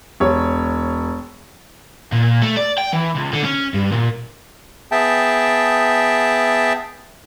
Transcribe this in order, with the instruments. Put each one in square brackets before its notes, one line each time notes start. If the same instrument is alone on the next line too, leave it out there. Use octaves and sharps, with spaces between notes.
[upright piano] E1 C#5
[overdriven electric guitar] A#2
A3
D5
G5
E3
C#2
D3
C#4
G2
A#2
[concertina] B3 G#4 E5 G5 A5